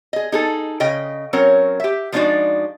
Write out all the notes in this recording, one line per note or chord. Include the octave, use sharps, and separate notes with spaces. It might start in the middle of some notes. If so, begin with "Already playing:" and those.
G#4 D#5
D#4 G#4 A4
C#3 D#5 G5
F#3 C4 C#4 A#4 C#5
G4 E5
F3 G#3 D4 D#4 F#4 D5